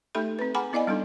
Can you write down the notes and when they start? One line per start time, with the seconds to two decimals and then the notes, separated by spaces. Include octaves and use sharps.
0.15 A3 D#4 G4 A4 E5 B5
0.39 C4 B4
0.55 G#4 F#5 G#5 A#5 B5 D6
0.73 B3 E4 D5 D#5 F5 G#5
0.87 G3 B3 D4 D#4 A4